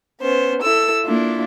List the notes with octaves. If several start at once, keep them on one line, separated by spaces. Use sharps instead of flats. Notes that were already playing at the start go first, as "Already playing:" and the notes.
B3 C#4 C5
E4 A4 E6
A#3 D4 E4 F4